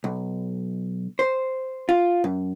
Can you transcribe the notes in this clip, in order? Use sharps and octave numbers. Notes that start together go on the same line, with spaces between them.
B1
C5
F4
F#2